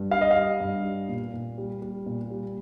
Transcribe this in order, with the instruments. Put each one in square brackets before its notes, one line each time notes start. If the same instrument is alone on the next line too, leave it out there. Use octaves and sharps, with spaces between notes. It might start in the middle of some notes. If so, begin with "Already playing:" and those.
Already playing: [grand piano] G2
G3 F5
D#5
F5
G3
G2
G3
A#2
A#2
G3
G3
A#2
G3